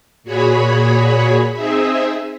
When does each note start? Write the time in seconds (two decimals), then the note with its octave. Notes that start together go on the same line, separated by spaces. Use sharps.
0.24 A#2 F#4 G#4 C#5 B5
1.53 C4 D#4 G#4 E5